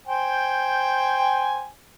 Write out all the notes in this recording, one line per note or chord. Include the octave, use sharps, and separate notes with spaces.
C5 G5 G#5